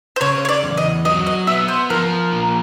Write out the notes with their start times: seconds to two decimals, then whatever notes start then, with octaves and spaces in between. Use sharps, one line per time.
0.16 C5
0.21 C#3 C#5
0.45 C#5
0.49 D5
0.63 E2
0.77 D#5
1.05 F#3 D#5
1.26 D#5
1.47 B3 E5
1.68 C5
1.90 F3 A#4
2.32 A#2